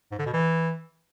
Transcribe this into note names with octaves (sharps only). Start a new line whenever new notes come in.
G#2
D3
B2
E3